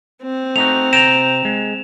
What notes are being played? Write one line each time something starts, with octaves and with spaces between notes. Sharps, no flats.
C4
A3 D#4 F#4 F7
C3 G5 A#5 E7 F7
G#3